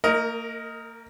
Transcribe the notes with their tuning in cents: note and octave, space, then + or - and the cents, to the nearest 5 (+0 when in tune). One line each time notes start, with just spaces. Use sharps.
A#3 -35 A#4 +0 D#5 +15